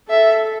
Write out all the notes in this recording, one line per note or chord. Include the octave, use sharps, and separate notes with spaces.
A4 E5